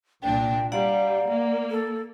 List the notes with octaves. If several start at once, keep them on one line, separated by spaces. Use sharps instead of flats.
C2 A#2 D4 G5
G3 D5 F5 F#5 A#5
A#3
A4